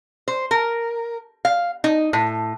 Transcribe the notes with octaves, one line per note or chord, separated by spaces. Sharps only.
C5
A#4
F5
D#4
A2